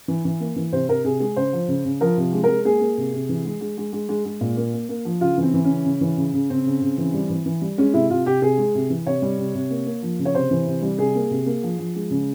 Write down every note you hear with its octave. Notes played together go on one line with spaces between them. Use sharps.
E3
E3
A#3
E3
C3 C5
C3 A#4
C3 G#4
G#3 G#4
C#3 C5
F3
C#3
C#3
F3 A#4
C3
G#3
A#4
G#3
A#3 G#4
A#3
C3
C3
E3
G#3
G#3
G#3
G#3
G#3
G#3
A#2
A#3
A#3
A#3
F3
C#3 F4
E3
C4
E3
C#4
C#3
C#3
E3
C#3
C#3
C#3 C4
C#3
C#3
E3
G3
E3
E3
G3
G#3 C#4
C3 E4
C3 F4
C3 G4
C3 G#4
G#3
C3
E3
C3 C#5
G3
C3
C3
A#3
A#3
F3
C#3
C#5
C3 C5
E3
C3
G3
C3 G#4
A#3
C3
A#3
F3
F3
G#3
C#3